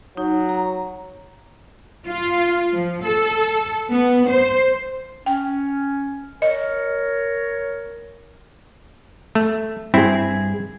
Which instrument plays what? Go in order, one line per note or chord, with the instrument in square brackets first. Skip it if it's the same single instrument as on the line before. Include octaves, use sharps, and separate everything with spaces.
[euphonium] F#3 [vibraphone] D#4
[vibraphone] A#5
[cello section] F4
F3
A4
B3
C5
[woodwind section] C#4 [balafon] G5
[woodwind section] A#4 C#5 [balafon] D#5
[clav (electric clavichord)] A3
[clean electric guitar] G2 G#4 [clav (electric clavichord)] C4 E4